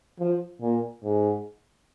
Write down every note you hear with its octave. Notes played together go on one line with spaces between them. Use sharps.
F3
A#2
G#2